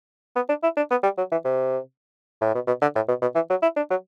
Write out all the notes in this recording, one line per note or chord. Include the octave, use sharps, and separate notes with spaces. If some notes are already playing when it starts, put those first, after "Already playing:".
B3
D4
E4
D4
B3
G3
F#3
E3
C3
A2
B2
B2
D3
A2
B2
B2
E3
F#3
E4
D4
F#3